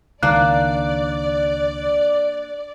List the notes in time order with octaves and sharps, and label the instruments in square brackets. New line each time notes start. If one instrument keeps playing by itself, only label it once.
[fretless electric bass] C#2 D#3 [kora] A#3 D4 [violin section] D5 [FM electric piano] F#6